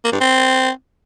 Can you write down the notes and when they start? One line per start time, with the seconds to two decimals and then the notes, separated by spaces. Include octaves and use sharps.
0.04 A#3
0.12 G2
0.20 C4